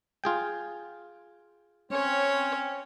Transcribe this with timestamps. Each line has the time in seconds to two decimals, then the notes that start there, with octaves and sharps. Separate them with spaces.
0.24 F4 G#4 G5
1.91 C4 C#4 C#5